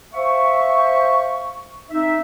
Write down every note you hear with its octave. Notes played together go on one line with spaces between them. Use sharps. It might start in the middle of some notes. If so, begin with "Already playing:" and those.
C5 E5 F5 C#6
C4 D#4 E5